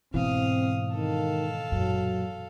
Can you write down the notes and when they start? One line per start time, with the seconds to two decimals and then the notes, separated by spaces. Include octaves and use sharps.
0.14 G#2 B2 E3 C4 F5 D#6
0.95 D#3 A4 F5
1.72 F#2 A#2 F#3